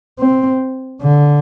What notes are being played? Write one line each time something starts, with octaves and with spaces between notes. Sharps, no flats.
C4
D3